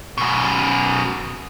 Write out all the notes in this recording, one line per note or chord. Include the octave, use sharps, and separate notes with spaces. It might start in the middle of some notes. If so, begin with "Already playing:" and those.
F#2 B2